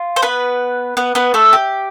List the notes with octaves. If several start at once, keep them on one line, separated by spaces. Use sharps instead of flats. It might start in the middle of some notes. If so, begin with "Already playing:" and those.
Already playing: F4
C5
B3 B4
B3 B4
B3 B4
A3 A4
G4